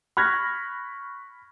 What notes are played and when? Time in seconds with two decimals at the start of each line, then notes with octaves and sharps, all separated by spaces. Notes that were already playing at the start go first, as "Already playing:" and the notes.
0.17 B5 C#6 F6 F#6 G#6 A#6